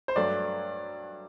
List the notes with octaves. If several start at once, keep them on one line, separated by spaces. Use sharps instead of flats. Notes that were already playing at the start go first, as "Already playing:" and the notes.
C5
G2 F#3 A3 D5